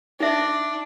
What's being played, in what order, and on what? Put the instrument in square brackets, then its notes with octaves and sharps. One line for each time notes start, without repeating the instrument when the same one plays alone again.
[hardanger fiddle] D4 [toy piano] D#4 E5